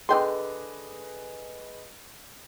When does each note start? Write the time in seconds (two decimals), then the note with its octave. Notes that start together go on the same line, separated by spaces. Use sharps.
0.09 D3 G#4 B4 D#5 G5 C6